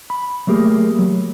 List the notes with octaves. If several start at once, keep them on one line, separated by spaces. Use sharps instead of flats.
B5
F#3 A3 A#3 G4 G#4
F#3